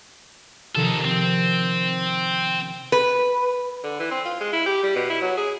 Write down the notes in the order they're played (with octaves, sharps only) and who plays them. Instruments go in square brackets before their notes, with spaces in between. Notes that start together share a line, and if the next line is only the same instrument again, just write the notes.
[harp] C3 D#3 F3 [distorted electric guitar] D#4 A4
[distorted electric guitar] C4
[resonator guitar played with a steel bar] B4
[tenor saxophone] D3
E3
C4
F4
G#3
E4
G4
G3
B2
E4
F#3
G#4